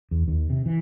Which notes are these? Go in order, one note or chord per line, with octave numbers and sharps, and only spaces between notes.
E2
D#2
C3
E3